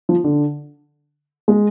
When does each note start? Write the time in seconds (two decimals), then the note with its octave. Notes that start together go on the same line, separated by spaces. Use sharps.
0.09 F3
0.24 D3
1.48 G#3